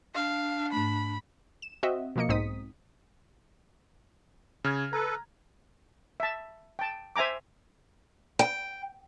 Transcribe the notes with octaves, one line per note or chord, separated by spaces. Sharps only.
D4 F5
G#2 A3 B5
E7
C4 F#4 D#5 E5
B2 F3 A#3 D#5 C#7
B1 G#2 C4 D#4 D#6 B6
C#3 F6 G#6
A4 B4 A#5
E5 A5
G5 A5
C5 E5 G#5 A#5 D6
G5